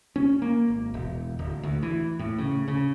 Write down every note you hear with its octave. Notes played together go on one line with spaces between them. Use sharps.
C#4
A#3
G#1
E1
D1
D2
E3
A2
C#3
C#3